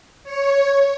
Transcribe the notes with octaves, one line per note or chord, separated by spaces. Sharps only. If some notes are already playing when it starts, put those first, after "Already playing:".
C#5